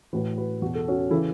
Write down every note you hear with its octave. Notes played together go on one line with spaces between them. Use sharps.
A2 E3 F#4 B4
F#4 B4
E2 B2 F#4
A4
C#4 F#4
C#3 E3 E4 A4